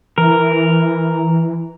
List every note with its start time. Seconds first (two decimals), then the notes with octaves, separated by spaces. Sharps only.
0.18 E3 A#4